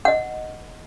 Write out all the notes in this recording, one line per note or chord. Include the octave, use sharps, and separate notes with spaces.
D#5 F#5